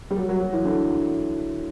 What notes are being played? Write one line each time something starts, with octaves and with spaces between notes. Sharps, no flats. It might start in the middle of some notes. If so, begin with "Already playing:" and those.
G3
F#3
F#3
F#3
E3
D3